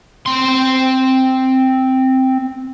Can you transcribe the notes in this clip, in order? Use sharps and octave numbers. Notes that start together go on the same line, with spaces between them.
C4 C6